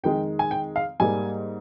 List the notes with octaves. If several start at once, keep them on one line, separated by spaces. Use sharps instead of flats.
F2 D#3 G#3 G5
G#5
G5
F5
G#2 G3 A#3 G#5